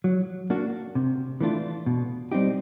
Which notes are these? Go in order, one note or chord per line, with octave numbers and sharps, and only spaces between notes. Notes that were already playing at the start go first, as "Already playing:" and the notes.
F#3
A#3 D4 F#4
C3
E3 A3 D4 F4
B2
G3 C4 D#4 G4